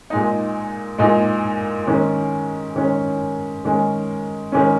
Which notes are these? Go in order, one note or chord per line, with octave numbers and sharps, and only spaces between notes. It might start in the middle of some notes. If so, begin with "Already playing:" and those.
A#2 G#3 D#4
A#2 G#3 D#4
D#3 G#3 C#4
D#3 G#3 C#4
D#3 G#3 C#4
D#3 G#3 C#4